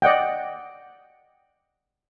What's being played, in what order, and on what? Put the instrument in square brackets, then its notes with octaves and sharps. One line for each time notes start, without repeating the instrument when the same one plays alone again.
[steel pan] D5 D#5 F#5 G5